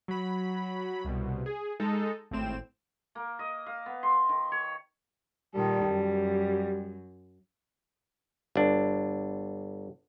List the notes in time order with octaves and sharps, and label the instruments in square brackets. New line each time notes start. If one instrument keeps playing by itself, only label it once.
[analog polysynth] F#3 B5
C2 B2
G#4
G#3 D#4 A4
G#1 A2 C4 E7
[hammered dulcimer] A#3
D#5
F5
B3
C6
D#3
C#5
[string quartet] A#2 D#3 A4 [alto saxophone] G3
[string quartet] F#2
[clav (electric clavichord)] G1 D4